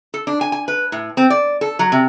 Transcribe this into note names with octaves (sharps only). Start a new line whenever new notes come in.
A4
D4
G#5
G#5
B4
A2
C4
D5
A4
F#3
C3